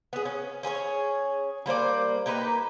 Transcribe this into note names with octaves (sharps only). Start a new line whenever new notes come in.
B3 G#4
C#4
C#4 G#4 B4 C#5
G3 A#3 C5 D5
A#3 D#4 G4 B4